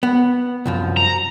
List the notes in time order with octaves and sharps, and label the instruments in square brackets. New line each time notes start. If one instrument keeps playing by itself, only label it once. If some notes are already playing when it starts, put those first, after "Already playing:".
[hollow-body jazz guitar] B3
C2 F#2 F3
[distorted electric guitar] A#5